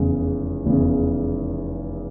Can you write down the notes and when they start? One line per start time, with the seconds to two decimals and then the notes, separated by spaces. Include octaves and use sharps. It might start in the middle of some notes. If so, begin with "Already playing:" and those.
Already playing: F1 E2 C#3
0.66 F1 E2 C#3